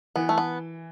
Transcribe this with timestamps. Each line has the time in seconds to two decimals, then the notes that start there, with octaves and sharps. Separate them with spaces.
0.16 E3 B3
0.29 A3
0.38 B3